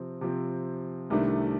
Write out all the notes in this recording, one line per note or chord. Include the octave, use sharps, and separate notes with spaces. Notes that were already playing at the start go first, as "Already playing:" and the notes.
Already playing: C3 F3 C4
C3 F3 C4
C2 C3 D#3 A3 D4